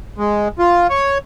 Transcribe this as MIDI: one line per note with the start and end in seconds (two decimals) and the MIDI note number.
0.18 0.48 56
0.59 0.87 65
0.90 1.18 73